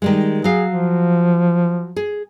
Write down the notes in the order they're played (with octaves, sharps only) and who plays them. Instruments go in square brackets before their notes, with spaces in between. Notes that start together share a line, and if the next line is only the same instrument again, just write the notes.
[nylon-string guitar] D#3 G3 G#3
[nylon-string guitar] F#3 F5 [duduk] G#4
[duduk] F3
[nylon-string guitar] G#4